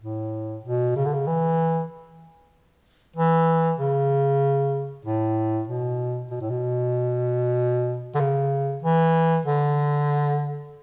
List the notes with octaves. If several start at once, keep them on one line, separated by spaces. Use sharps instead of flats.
A2
B2
C#3
D3
C#3
E3
E3
C#3
A2
B2
B2
A2
B2
D3
C#3
E3
D3